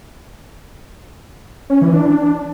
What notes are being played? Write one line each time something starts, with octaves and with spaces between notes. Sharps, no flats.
C#4
E3
D4